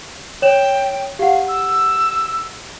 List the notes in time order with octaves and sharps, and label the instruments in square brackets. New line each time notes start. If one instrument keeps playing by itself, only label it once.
[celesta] C#5 E7 [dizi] G5
[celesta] G4 F#5 [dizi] F5
[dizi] E6